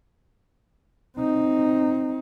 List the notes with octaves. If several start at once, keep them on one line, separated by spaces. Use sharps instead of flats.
C4 D#4